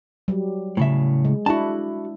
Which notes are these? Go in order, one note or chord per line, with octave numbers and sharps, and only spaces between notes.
F#3 G3
A2 C#3 E5
G#3
D4 E4 F#4 A5